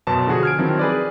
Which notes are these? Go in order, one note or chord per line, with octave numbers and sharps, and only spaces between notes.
F#2 B2 B3 C#4 A5
D3 F3 F#4 G#4
F6 G#6 D7
D#3 F3 F#3 C4 E4
G#4 B4 D5